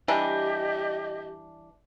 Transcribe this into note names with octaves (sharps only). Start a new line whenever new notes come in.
E3 G3 D4 G4 D#5